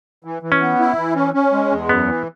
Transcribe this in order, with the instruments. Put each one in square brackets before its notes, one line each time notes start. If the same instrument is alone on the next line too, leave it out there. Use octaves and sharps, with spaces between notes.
[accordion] E3
E3
[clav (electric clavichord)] C#4
[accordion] B3
E4
E3
C#4
C#4
G#3
E2
[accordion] F#2 [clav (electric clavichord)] B3
[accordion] E3